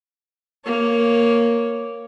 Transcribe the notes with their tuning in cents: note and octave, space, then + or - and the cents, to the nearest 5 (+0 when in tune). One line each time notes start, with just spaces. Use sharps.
A#3 +0 C#5 +0